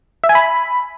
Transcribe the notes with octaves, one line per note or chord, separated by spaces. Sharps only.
E5
G#5
B5